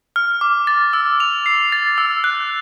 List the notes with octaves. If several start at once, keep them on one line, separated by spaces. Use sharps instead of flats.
F6
D6
A6
E6
F7
C7
A6
E6
F#6